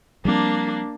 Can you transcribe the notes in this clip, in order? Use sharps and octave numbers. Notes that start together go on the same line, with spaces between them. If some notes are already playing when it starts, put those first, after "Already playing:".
F3 G3 A#3 C4 D4